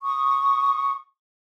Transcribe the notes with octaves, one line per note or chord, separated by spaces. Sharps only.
C#6 D#6